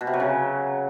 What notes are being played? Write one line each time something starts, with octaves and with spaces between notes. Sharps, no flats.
B2
C3
F#3
C#3